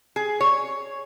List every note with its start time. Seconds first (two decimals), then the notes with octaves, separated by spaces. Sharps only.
0.16 G#4
0.40 C#5